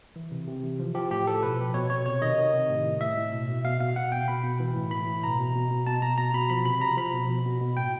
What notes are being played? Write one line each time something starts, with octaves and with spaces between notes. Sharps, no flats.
E3
C3
C3
E3
F3
F3 G4
A2 G4
F3 A4
B2 B4
B2
B2 C#5
B2 C#5
C3 C#5
D#3 D#5
D#3
C3
A2
A2
A2 E5
A2
B2
B2
B2 F5
B2 F5
B2 F#5
B2 G5
B2 B5
B2
E3
A2
E3 B5
A2
B2 A#5
B2
B2
B2
B2 A5
B2 A#5
B2 A#5
B2 B5
F3 B5
C3 B5
F3 A#5
F3 B5
B2
B2
B2
B2
A2 G5